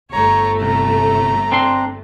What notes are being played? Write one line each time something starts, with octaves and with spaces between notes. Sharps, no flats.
G1 A3 C#5 A#5
C2 A#5
C4 D4 C6